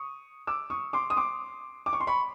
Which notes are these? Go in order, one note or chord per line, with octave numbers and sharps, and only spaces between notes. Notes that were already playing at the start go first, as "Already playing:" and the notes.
Already playing: C#6 D#6
D6 E6
C#6 D#6
C6 D6
D#6
C6 D6
D6
C#6
C6
B5 C#6